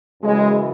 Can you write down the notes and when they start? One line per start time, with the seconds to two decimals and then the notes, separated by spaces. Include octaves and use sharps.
0.22 F#2 C#3 E3 G#3